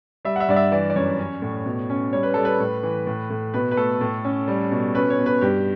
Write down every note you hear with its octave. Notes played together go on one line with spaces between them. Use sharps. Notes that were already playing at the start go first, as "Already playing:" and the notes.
G3 E5
F#5
E5
G2 D5
E5
E3 D5
D5
F#2 C#5
C#4
A2
B2
C#4
G3 C#5
B4
G3 A4
B4
A2
E3
A2
A2
B2 B4
B4
A3 A4
A2
C#4
G3
B2
C#4 B4
C#5
B2
B4
G2 G4